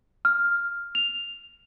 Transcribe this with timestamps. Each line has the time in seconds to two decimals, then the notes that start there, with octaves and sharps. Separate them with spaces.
0.25 F6
0.95 F7